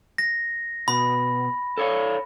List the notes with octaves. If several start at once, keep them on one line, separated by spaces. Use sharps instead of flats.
A#6
B2 B5
A4 C#5 F5